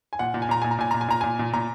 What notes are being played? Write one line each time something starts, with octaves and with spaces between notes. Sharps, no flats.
G#5
A#2 F#5
A#2
G#5
A#2 A#5
A#2 G#5
A#5
A#2 G#5
A#2 A#5
G#5
A#2 A#5
A#2 G#5
A#2
A#2 A#5